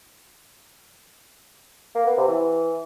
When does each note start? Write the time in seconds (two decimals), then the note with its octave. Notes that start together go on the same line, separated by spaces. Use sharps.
1.95 A#3
2.06 B3
2.17 C3
2.28 E3